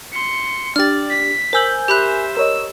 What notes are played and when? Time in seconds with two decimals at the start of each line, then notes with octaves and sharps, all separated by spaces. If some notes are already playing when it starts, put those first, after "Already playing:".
0.13 C6 C#7
0.76 D4 G4 D5 F6 A6
1.10 B6
1.53 A#4 C5 G#5 E6 G6 F#7
1.88 G4 C5 E5 B5 F#6
2.37 A#4 C#5 D#5 E6